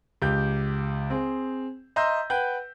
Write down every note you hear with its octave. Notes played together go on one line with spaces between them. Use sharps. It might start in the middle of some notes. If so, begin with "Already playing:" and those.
C#2 G4 G6
C4 G#4
D#5 E5 A#5 C6 E6 G6
B4 F#5 G5 G6